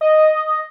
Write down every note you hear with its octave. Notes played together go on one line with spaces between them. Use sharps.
D#5